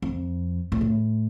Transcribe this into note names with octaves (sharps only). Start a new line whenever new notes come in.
F2
A#2
A2